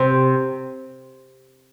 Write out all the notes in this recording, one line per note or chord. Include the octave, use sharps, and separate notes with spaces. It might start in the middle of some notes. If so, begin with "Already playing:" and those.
Already playing: C3